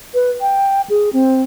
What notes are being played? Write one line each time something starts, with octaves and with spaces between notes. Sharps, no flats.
B4
G5
G#4
C4